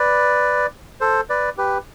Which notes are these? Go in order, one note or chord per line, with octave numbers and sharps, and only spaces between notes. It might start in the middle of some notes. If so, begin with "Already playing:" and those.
Already playing: B4 D5
A4 C5
B4 D5
G4 B4